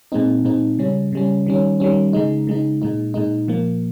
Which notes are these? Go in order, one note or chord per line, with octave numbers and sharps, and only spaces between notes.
A#2 G#3 C4 D#4
A#2 G#3 C4 D#4
C#3 G3 C#4
C#3 G3 C#4
D#3 G3 C#4
D#3 G3 C#4
C#3 G#3 D#4
C#3 G#3 D#4
A#2 G#3 D#4
A#2 G#3 D#4
A#2 F3 A#3